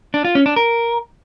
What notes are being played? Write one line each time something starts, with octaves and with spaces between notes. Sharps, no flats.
D4
F4
C#4
D4
A#4